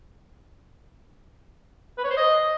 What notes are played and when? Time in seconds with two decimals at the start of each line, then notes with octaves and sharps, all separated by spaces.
1.98 B4
2.04 C#5
2.11 C5
2.17 D#5